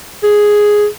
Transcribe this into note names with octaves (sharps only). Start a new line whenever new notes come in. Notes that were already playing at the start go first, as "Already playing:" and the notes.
G#4